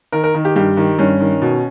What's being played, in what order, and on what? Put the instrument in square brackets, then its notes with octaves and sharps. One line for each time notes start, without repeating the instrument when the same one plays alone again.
[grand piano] D#3 A#4
A#4
D#3
G4
G2 G4
D#3
G2 C#4
D#3
B2